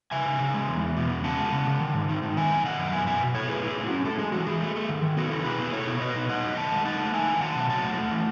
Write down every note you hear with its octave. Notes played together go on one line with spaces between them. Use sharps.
C#3 E5 G#5
C#3
C#3
G#3
E2
E2
B2
E2
C#3 F#5 A5
G#3
C#3
C#3
D#3
G#2
D#3
D#3
B3 E5 G#5
F#2
D#3 D#5 F#5
F#2
B2 E5 G#5
B2 E5 G#5
B2
E4 A4 C#5
A2 G#4 B4
E4
G#4
A2
C#4 F#4
A2 A4
G#3 G#4
E3 F#4
E3 G#4
A3
A3
D#3
D#3
B3 F#4 A4
E4
B2 G#4 B4
E4
B2 A4 C#5
B2
B2 B4 D#5
D#4
D#4 D#5 F#5
F#2
D#3 F#5 A5
G#3
D#4 F#5 A5
A3
D#4 E5 G#5
D#3
F#3 F#5 A5
B2
F#3 F#5 A5
A3
A3
E3